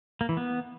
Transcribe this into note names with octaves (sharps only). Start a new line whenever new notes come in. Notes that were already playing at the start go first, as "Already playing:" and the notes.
A#3
E3
B3